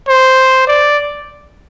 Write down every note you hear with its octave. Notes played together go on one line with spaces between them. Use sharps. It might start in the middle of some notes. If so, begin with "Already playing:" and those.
C5
D5